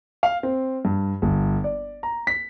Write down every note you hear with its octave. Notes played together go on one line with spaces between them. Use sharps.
F5
C4
G2
G1
D5
A#5
B6